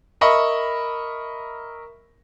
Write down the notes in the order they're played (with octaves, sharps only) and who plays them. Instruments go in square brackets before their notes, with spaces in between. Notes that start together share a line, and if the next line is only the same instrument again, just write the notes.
[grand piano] A#4 D#5 E5 B5 C#6